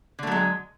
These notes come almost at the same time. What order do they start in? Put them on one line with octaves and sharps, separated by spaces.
D3 A3 F#3 G#3